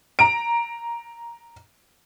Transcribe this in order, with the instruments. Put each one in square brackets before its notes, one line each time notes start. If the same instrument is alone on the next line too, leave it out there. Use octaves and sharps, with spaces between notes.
[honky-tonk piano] A#5 D7